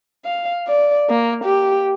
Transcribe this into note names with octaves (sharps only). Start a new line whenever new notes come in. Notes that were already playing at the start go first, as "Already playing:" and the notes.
F5
D5
A#3
G4